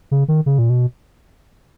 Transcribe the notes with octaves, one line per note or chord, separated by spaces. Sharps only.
C#3
D#3
C#3
A#2
B2